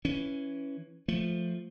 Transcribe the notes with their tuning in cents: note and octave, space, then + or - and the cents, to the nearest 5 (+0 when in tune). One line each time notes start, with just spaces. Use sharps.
E3 +0 C#4 +0
F3 +0 A3 +0